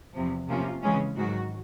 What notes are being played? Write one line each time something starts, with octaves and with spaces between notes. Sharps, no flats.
E2 C3 F3
C3 F3 A#3 C#4 F4
C#3 E3 G#3 C#4
G#2 D#3 F#3 F#4